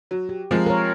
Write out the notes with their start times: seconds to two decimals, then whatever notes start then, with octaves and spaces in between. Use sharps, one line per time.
0.11 F#3
0.29 G4
0.51 F3 G#3 C4 F4 A#4
0.66 A#4 C#5